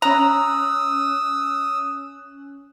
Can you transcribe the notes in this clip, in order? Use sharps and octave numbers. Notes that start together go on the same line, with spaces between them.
C#4 A#5 D#6 E6 F#6